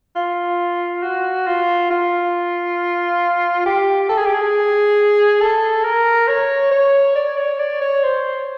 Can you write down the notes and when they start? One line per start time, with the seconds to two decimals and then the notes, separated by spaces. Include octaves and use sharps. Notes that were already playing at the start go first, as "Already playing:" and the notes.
0.16 F4
1.03 F#4
1.47 F4
1.90 F4
3.66 G4
4.09 A4
4.17 G#4
4.26 G4
4.34 G#4
5.41 A4
5.84 A#4
6.28 C#5
6.71 C#5
7.16 D5
7.37 C#5
7.59 D5
7.81 C#5
8.03 C5